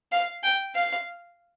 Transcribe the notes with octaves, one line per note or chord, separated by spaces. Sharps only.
F5
G5
F5